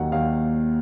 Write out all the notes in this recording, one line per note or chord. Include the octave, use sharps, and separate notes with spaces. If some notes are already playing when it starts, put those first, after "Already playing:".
Already playing: D#2 D#3 F#3 F#5
D#2 F5